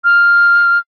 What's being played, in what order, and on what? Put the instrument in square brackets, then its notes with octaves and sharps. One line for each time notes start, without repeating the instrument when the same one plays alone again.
[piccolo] F6